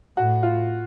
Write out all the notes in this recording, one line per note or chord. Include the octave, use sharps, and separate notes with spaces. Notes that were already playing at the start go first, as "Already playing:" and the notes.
A2 F#4
F4